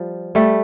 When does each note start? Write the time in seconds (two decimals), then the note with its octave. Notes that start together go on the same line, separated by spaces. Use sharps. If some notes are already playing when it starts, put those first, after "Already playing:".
Already playing: F3 G3
0.35 G3 A3